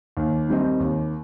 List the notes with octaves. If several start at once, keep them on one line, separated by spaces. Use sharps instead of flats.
D#2
D#3 G3 C4 D#4
D#2